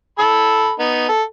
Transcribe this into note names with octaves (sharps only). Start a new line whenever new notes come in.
A4 B5 E6
B3 D#4
A4